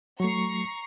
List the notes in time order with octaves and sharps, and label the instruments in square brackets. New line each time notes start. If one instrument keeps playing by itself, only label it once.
[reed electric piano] F#3 A3 [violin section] A#5 C#6 C7